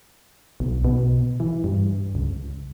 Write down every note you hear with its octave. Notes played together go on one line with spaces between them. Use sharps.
B1
B2
E3
G2
C#2